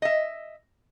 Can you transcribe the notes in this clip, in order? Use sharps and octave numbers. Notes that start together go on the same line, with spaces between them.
D#5 E5